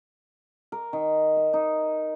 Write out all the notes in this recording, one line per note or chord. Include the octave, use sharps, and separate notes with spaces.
A#4
D#3
E5
D#4